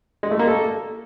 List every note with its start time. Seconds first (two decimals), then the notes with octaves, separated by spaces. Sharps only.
0.23 G#3
0.31 A3
0.39 A#3
0.47 A4